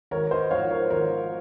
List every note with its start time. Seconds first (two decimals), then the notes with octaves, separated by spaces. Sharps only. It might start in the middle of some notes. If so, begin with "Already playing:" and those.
0.11 G#1 A#4 C#5
0.31 C5 D#5
0.51 G#2 F3 C#5 F5
0.71 A#4 C#5
0.90 G#1 A#4 C#5